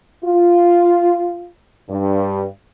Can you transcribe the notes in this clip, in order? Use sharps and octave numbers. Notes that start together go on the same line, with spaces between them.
F4
G2